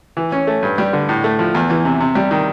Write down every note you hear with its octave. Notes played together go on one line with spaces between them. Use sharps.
E3
C#4
A3
G2
G3
D3
A2
A3
F3
E2
E3
C3
C3
G3
D#3